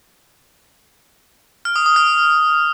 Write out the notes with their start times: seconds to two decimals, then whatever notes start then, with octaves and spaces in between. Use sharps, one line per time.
1.65 F6
1.76 D#6
1.86 D#6
1.96 F6